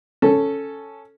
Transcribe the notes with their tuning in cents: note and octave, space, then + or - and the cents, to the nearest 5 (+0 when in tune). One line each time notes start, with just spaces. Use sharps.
C#4 +0 A4 +0